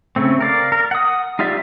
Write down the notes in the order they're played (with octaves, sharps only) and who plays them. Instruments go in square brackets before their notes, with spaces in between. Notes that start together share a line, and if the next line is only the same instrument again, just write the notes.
[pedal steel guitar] C#3 A3 C4
A#4 D5 F5
A#4
F#5 D#6
D#4 F4 G4 D5 E5